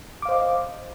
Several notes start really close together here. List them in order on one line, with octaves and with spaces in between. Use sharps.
D6 F5 C5 D#5